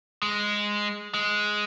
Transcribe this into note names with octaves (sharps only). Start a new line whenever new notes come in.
G#3
G#3